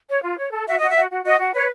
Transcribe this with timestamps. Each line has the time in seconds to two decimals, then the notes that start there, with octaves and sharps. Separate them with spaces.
0.09 C#5
0.22 F4
0.38 C#5
0.52 A4
0.67 F#4 E5
0.78 F#4 D#5
0.90 E5
0.95 F#4
1.09 F#4
1.24 F#4 D#5
1.39 F#4
1.53 B4 C#5